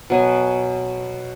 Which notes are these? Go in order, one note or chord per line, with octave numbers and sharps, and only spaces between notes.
B2 F#3 G#5